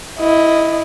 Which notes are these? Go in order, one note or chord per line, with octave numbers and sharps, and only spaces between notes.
E4 D#5